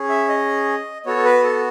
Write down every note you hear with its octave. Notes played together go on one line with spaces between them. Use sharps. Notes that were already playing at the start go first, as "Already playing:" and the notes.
Already playing: C#4 G#4
E5
D#5
B3 F#4 A4 C#5
A4
B4
A4